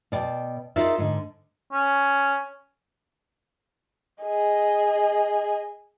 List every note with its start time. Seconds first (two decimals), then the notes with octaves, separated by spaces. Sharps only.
0.12 B2 D5 G5
0.76 D#4 F4 G#4 A#4 D5 E5
0.98 G#2 D3
1.73 C#4
4.23 G#4 D#5